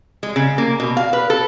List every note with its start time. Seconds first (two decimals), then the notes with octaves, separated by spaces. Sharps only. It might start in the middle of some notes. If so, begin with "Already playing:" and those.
0.23 G#3
0.36 C#3
0.58 A#3
0.80 B2
0.97 F5
1.13 B4
1.30 A4